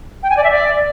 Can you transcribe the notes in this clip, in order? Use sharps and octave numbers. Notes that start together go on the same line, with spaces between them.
G5
G#5
D5
E5
D5